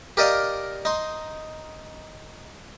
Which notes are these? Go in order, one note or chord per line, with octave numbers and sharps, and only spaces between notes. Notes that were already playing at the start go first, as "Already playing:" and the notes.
G4 A#4 D5 D#5 F5
D#4 C6